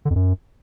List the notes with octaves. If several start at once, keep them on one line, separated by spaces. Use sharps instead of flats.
D3
F2
F#2